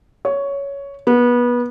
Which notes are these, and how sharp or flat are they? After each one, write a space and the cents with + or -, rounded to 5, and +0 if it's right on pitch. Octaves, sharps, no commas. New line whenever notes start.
C#5 +10
B3 -25